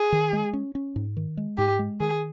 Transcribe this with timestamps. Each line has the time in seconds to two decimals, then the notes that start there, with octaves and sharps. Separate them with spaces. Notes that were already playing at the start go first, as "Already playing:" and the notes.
Already playing: G#4
0.12 D#3
0.33 G#3
0.53 C#4
0.75 C#4
0.96 G#2
1.17 D#3
1.37 G#3
1.58 G#2 G4
1.79 G#3
2.00 D#3 G#4